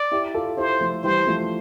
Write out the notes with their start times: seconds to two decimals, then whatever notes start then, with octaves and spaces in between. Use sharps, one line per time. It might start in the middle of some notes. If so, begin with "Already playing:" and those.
Already playing: D5
0.11 E4 G4
0.34 F4 A4
0.57 E4 G4 C5
0.80 F3 A3
1.03 E3 G3 C5
1.27 F3 A3